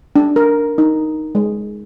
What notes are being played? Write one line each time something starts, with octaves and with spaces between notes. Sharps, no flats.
D4
A#4
D#4
G#3